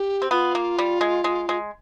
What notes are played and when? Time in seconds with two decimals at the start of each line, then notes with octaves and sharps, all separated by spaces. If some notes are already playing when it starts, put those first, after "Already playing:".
Already playing: G4
0.22 C4
0.31 B3 F4
0.55 A#3
0.78 G3
1.01 G#3
1.24 G#3
1.49 G#3